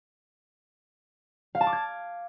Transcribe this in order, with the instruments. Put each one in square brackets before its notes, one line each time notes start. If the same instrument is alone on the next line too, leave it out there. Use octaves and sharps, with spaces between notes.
[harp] F5
A5
D6
G#6